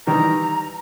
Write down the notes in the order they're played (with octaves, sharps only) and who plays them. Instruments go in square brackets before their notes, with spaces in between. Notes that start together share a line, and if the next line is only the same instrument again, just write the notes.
[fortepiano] D#3 E3 G3 [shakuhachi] A#5